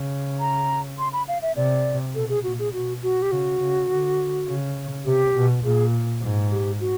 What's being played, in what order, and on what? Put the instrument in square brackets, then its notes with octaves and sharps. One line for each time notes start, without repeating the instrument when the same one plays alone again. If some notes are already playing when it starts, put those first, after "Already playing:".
Already playing: [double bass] C#3
[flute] A#5
C6
B5
F5
E5
[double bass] C3 [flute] D5
[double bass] B2 [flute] A4
[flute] G#4
[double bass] A#2 [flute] F#4
[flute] G#4
[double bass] B2 [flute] F#4
[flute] F#4
G4
[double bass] C#3 [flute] F#4
[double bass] C#3
D3
C#3
[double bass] C3 [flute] G4
[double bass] B2
[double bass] A#2 [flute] G#4
[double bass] G#2
[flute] G4
F#4